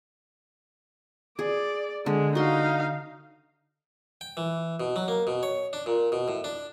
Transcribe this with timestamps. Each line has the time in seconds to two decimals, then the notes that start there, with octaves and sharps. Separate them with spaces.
1.39 G#4 D5
2.06 D3 G#3
2.35 D#4 F#4 F5 C6
4.21 G5
4.37 E3
4.80 B2
4.96 F#3
5.08 A#3
5.27 B2
5.43 C#5
5.73 D4
5.86 A#2
6.12 B2
6.28 A2
6.44 D4